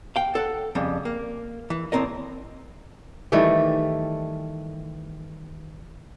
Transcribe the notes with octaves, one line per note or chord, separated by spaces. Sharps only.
F5 G5
A4 F#5
F2 C#3 G3
A#3
E3
E2 A2 C4 A#4 D#5
D#3 E3 G3 A3